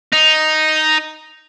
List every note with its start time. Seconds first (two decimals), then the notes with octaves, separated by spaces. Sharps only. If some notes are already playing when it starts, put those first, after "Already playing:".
0.12 D#4